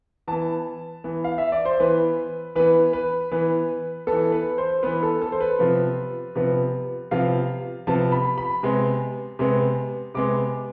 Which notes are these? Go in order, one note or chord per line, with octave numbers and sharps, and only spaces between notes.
E3 B3 A5
E3 B3
F5
E5
D5
C5
E3 B3 B4
E3 B3 B4
B4
E3 B3 B4
E3 B3 A4
B4
C5
E3 B3 B4
A4
A4
C5
B4
C3 F3 B3
C3 F3 B3
C3 F3 B3 F5
C3 F3 B3 A5
B5
B5
C3 G#3 B3
C3 G#3 B3
C3 G#3 B3 D6